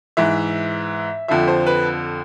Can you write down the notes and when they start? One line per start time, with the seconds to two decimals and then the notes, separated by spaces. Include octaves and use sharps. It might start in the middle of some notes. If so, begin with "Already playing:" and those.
0.17 G#2 E3 E5
1.28 F2 D3 F3 E5
1.48 C5
1.66 B4